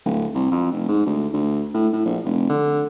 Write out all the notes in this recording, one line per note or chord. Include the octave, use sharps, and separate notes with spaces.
D1
C2
F2
F1
G#2
D2
D2
A2
A2
A#1
F1
D3